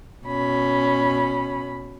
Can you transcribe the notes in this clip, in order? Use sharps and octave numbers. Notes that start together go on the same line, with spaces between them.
B2 C#4 B5